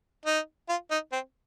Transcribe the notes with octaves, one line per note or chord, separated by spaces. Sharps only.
D#4
F4
D#4
C4